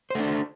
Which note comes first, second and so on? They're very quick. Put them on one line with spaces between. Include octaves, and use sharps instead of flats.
C5 A3 D4